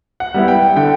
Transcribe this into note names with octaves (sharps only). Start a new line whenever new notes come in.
F#5
G3 B3 E4
G5
D3 G5